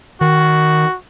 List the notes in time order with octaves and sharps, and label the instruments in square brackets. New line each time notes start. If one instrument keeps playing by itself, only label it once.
[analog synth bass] D#3 [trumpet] F#4